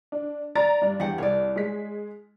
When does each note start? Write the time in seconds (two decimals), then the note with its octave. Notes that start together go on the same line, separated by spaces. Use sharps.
0.12 D4
0.55 D5 A#5 A6
0.81 G2 D4
1.00 E2 G4 F#5
1.18 C2 C#5 D5
1.56 G#3 B6